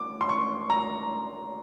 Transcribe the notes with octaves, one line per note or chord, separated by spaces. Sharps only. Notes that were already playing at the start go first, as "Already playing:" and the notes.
Already playing: D6
C6
C#6
A#5